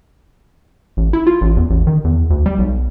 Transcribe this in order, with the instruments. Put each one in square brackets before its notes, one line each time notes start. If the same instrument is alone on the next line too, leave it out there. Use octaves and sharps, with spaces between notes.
[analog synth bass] A1
E4
F4
A1
E2
A1
D#3
E2
D2
G3
B1